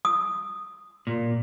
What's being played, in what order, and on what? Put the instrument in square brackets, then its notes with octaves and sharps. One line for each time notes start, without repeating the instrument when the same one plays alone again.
[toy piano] D#6
[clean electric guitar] A#2